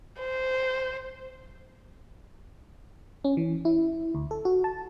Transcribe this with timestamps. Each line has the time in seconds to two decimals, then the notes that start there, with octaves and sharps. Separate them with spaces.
0.21 C5
3.24 C#4
3.37 E3
3.65 E4
4.15 D2
4.31 A4
4.45 F#4
4.64 A5